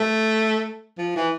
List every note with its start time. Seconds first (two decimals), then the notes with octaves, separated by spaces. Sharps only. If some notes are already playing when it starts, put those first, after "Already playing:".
Already playing: A3
0.98 F3
1.16 E3